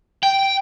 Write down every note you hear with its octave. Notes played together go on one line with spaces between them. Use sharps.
G5